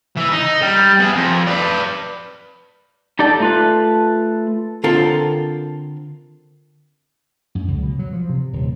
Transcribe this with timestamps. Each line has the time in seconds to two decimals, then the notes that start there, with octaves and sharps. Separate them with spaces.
0.17 E3
0.32 D#4
0.62 G3
1.00 B3 G#4
1.15 F2
1.47 B4 D5
3.19 D#4 G4 A4 D5 A5
3.40 A3 F4 B4
4.84 D3 C4 F4 A4 A#4
7.55 F#2
7.68 C#2
7.83 B2
7.99 F#3
8.13 F3
8.29 C3
8.53 D#1